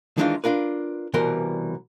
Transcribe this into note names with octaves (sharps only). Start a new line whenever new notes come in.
D#3 E3 G#3 D4 D#4 F4
D4 F4 A#4 B4
C2 B2 E3 G3 A#4 C6